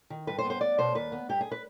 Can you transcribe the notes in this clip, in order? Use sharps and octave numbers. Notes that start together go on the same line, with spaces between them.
D#3
G2 B4
C5
B3
C5
B3 D5
B2 C5
D#2 B4
B3
G2 G4
G#4
B4